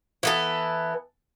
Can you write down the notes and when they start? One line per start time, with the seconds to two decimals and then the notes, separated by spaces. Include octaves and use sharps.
0.23 E3 B3 A4